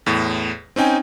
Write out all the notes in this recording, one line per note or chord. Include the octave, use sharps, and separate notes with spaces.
E2 A2
C4 C#4 D#4 G5 G#5